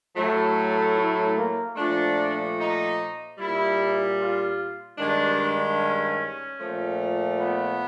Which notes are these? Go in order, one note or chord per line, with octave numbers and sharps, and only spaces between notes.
A2 F#3 A3
E4
A#3
A#2 F3 A3 D4
D#4
A#2 G3 E4
F4
G2 D#3 G#3 D4
C#4
A#2 F3 A3
B3